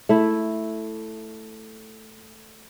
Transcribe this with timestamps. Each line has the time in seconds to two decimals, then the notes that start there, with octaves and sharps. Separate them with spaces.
0.09 A3 E4